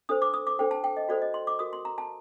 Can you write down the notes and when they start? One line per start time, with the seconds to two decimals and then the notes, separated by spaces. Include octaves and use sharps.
0.09 D4 A4 C5 D#6
0.22 D6
0.34 D#6
0.47 D6
0.59 D4 A4 C5 G5
0.71 A5
0.84 G5
0.97 D#5
1.09 F#4 A4 C5 D5
1.22 D#5
1.34 C6
1.47 D6
1.59 F#4 A#4 D#6
1.73 C6
1.85 A#5
1.98 A5